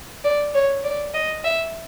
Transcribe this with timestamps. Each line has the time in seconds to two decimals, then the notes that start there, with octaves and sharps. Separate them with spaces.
0.24 D5
0.54 C#5
0.84 D5
1.14 D#5
1.44 E5